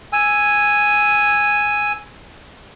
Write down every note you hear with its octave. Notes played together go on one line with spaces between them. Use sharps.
G#5 E6